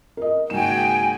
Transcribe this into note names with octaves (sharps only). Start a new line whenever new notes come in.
A#4 D#5
G#1 C#3 A#3 F#4 G5 G#5 E7